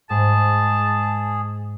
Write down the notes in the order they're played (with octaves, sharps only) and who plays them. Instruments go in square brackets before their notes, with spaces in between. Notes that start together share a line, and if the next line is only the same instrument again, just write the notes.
[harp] G#2 [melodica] G#4 [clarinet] A5